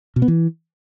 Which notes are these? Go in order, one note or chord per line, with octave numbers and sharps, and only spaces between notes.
B2
B3
E3